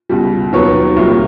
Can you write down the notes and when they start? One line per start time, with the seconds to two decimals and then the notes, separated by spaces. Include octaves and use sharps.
0.09 C#2 B2 G3
0.53 D#2 D#3 F#3 B3 C#5
0.97 C2 A#2 F#3 A#3